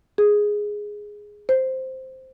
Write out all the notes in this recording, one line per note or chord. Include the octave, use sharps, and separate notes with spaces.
G#4
C5